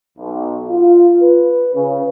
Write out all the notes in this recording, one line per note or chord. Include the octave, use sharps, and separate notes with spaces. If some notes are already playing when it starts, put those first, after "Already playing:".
B1
F4
B4
C#3